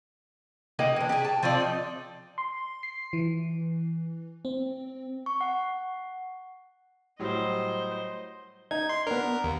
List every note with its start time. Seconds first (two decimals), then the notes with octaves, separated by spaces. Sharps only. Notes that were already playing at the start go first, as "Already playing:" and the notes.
0.79 A#3 D#4 G4 F#5
0.96 E3 D4
1.09 G4 G#4
1.25 A5
1.43 F3 C4 F4 D5
1.60 D#4
2.38 C6
2.83 C7
3.13 E3
4.45 C4
5.26 C#6
5.41 F#5
7.19 A2 F#3 G3 C5 D#5
8.71 D#4 G#6
8.89 C6
9.07 B3 D4 A#4
9.44 D#2